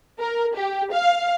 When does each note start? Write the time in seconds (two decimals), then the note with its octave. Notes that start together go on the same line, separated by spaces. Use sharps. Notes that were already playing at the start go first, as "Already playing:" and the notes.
0.19 A#4
0.55 G4
0.92 F5